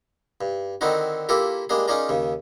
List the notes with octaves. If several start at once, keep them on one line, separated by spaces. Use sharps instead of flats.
G2
D3 D#3 C4 D#4 E4 F#4
A#3 E4 F4 G4 A4 A#4
G3 G#3 A#3 D4 G#4
C#4 D#4 F4 G#4 A#4 D5
D#2 C#3